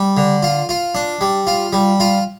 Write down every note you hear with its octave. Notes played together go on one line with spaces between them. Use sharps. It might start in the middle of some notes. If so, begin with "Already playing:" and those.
Already playing: G3
D3
F4
F4
D4
G3
F4
G3
F4